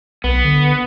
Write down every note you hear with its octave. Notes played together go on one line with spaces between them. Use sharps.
B1 B3
D3